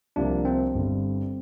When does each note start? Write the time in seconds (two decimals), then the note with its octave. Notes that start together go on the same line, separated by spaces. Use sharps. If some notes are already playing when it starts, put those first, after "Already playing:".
0.16 C2 C3 F3 A#3 D4
0.45 C4
0.74 G1 G2 D3 G3